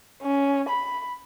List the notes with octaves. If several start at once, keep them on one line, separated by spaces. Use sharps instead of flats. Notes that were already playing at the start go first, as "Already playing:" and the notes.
C#4
B5